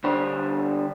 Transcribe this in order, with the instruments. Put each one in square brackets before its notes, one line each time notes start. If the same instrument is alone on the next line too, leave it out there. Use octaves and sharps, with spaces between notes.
[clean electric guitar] D3 G3 D4 C5 C#5